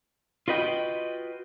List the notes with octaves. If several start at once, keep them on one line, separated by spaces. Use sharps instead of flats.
F4 F#4 B4 D#5 G5